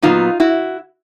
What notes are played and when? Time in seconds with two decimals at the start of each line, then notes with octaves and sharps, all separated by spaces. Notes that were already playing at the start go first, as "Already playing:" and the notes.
0.02 A#2 F#3 B3 D#4 F4
0.40 E4 F#4